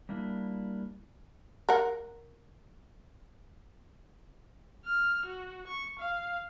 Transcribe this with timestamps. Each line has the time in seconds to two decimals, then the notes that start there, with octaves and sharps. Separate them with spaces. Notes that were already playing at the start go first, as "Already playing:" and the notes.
0.09 G3 A#3 D4 E4
1.69 A#4 F#5
4.86 F6
5.26 F#4
5.68 C#6
5.99 F5